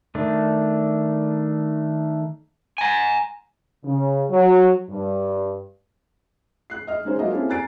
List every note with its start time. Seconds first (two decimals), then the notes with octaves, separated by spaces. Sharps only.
0.15 D#3 A3 D4
2.78 G#5 A#5
3.84 C#3
4.30 F#3
4.90 G2
6.70 F#6 C7
6.87 D#5 F6
7.05 G#3 C#4 D#4 G#4 C5
7.18 F#3 G#3 A#3 D4 F4 D#5
7.32 A#3 C4 C#4 E4 G#4 A4
7.49 G#5 A#5 F#6 A6 C7 D7